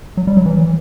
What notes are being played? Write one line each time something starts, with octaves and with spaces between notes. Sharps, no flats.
F#3
G3
F#3
E3